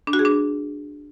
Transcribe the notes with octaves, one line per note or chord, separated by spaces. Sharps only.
D4
F#4
G#4
D4